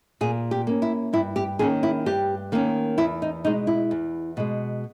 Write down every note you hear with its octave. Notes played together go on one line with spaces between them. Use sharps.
A#2 G#4
G4
A#3 C#4
E4
G2 E4
G4
D#3 A#3 C#4 G#4
E4
G2 G4
D#3 A#3 C#4
E2 E4
D#4
B2 G#3 D#4
E4
E2
B2 G#3